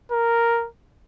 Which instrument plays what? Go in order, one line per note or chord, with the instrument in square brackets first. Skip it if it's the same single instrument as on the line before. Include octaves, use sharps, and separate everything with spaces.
[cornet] A#4